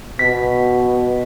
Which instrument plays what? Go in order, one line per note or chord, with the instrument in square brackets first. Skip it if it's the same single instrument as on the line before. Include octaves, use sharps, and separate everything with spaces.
[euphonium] B2 [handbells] B6